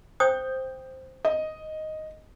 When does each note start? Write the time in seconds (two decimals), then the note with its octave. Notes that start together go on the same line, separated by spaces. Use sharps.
0.20 C5 G5 D#6 G6
1.25 D#5